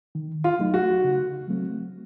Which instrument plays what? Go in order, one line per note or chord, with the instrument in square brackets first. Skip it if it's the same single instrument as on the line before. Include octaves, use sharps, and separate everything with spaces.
[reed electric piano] D#3
[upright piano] F4
[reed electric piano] F#3 A3 D#4
[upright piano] F#4
[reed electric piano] C#3
F#3 A3 C4